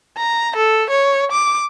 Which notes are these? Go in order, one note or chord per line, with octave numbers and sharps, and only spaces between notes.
A#5
A4
C#5
D6